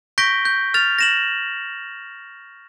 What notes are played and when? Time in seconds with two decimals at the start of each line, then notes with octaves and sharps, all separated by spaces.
0.18 C#6 G6 A#6 B6 D7 G7
0.45 G6
0.74 F6 A6 F7
0.99 A#6 E7 F#7